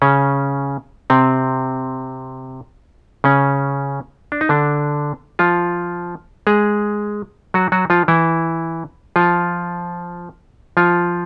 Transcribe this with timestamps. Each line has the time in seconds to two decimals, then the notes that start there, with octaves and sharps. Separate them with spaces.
0.02 C#3 C#4
1.10 C3 C4
3.24 C#3 C#4
4.32 D4
4.41 D#4
4.49 D3 D4
5.39 F3 F4
6.47 G#3 G#4
7.54 F#3 F#4
7.72 F#3 F#4
7.90 F3 F4
8.08 E3 E4
9.16 F3 F4
10.77 F3 F4